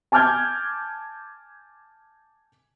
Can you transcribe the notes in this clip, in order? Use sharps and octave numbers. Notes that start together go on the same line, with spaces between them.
G#5 A5 D6 F6 G6 G#6